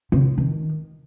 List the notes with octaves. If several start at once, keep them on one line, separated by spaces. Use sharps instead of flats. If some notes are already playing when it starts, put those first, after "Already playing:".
C#3
D#3